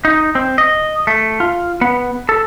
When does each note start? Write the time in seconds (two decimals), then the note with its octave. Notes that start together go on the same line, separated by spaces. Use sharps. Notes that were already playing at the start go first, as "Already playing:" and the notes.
0.05 D#4
0.35 C4
0.58 D#5
1.07 A3
1.40 F4
1.81 B3
2.29 A4